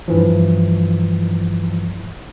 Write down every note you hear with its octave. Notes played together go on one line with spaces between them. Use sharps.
G2 E3 F3